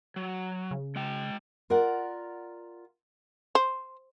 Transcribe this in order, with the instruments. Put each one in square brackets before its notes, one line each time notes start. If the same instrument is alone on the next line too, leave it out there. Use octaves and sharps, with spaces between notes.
[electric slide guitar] F#3
[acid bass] C#3
[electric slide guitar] G#3 G5
[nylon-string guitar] F4 A#4 D5 F#5
[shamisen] C5